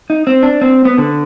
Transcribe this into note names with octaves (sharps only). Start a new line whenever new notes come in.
D#4
C4
D4
C4
B3
D3